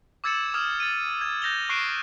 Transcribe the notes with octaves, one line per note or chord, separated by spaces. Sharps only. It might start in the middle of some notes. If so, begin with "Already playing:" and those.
D6 E6 G#6 A6 C#7 E7
D#6 F6 G#6
A6 D#7
G#6
G6 A#6 F7 G7
C#6 F#6 C7 D7 E7